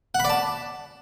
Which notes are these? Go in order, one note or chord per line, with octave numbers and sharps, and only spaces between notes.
F#5
B5
D5
A5